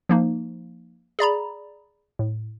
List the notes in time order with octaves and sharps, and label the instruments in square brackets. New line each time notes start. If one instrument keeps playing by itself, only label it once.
[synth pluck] F3 A#3 D#4
G#4 D5 A#5 B5
A2